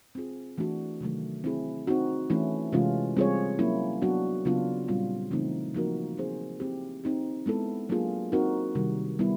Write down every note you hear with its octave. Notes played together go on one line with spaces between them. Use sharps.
C4 F4 G#4
E3 A3 D4 F#4
C3 D#3 F#3 A3
C4 E4 G#4
C4 D#4 F#4
E3 A3 C#4 E4
C3 E3 G#3 C#4 F4
G3 C4 F4 G#4 C#5
F#3 A#3 C#4 E4
F#3 B3 D4 F#4
C#3 F#3 B3 D4 F4
A#2 G3 C4 F4
C#3 E3 A3 C4 D#4
F3 A#3 D#4 F#4 A#4
C4 D#4 G#4 C5
C4 E4 G4
C4 D#4 G4
G#3 B3 E4 A4
F#3 A#3 D4 F4 G#4
C4 D#4 F#4 A#4
C3 D#3 G3
G3 B3 E4